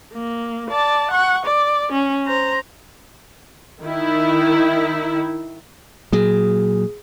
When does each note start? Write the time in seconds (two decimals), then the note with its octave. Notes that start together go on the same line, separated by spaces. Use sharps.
0.14 A#3
0.70 D5 A5
1.11 F#5 C#6
1.45 D5
1.92 C#4
2.26 C5 A#5
3.82 D#3 E4
6.12 A#2 F#3 G#4